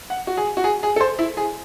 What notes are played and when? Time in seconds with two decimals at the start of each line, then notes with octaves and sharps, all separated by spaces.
0.10 F#5
0.27 F#4
0.37 G#4
0.57 F#4
0.64 G#4
0.83 G#4
0.96 A4
1.01 C5
1.19 E4
1.37 G#4